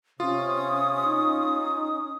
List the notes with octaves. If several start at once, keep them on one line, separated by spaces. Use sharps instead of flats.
C3 C#4 F4 D#6
D#4